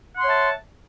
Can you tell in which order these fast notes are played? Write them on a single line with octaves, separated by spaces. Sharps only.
F#5 C6 C#5 E5 A5